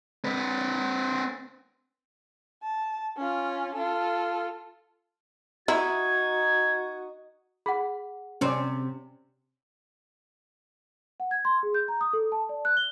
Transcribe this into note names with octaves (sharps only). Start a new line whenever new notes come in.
C4 B4
A5
C#4 F4
F4 A4
D#4 E4 F#4 G#6
G#4 F#5 B5
C3 C4 C#4 D5
F#5
G#6
C6
G#4
G6
A#5
D#6
A4
A5
D5
F#6
G7